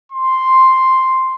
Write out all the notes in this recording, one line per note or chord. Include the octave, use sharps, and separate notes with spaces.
C6